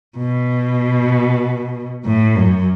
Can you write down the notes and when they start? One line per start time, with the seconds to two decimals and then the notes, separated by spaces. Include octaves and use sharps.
0.18 B2
2.05 A2
2.36 F#2